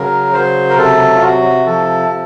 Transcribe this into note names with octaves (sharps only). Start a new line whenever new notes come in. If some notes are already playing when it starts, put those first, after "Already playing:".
Already playing: C#3 F#3 A#4
F#3 C5
A#4
C3 A4
F4
C3 F#4
F3 A4
C3